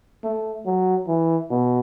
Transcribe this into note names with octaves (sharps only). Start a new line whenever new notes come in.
A3
F#3
E3
B2